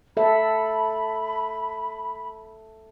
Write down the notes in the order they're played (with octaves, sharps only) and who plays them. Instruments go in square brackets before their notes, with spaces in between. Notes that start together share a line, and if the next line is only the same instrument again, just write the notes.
[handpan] A4 E5 [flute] B5